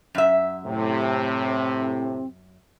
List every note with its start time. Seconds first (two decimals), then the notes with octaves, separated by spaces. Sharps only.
0.15 F#2 E5
0.66 A2 C3
1.15 C4